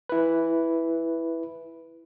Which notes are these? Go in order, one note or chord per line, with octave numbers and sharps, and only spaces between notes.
E4 B4